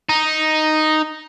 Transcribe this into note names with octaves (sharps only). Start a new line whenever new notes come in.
D#4